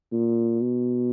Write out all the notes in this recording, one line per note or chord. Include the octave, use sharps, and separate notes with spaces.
A#2
B2